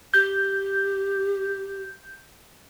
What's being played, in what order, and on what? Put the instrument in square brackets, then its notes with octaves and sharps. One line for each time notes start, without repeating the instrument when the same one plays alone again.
[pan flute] G4 [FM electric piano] G6